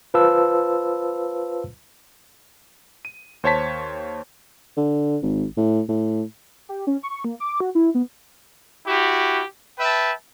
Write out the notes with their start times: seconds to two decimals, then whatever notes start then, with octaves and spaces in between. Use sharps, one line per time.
0.14 F4 B4 C5 F5 A5 E6
3.05 D#7
3.44 D#2 C5 C#5 A5 B6
4.77 D3
5.23 G#1
5.57 A2
5.89 A2
6.69 G4
6.87 C#4
7.03 C#6
7.24 A#3
7.40 D6
7.60 F#4
7.75 E4
7.95 B3
8.87 E4 F#4 G4
9.79 B4 E5 G5 A5